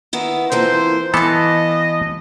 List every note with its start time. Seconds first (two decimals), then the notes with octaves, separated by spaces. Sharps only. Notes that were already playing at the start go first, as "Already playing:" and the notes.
0.13 D#3 B3 E4
0.52 F2 E3 A#3 C5
1.14 E3 B3 A4 D#5 F5 A5